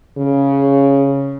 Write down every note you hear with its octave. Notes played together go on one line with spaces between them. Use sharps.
C#3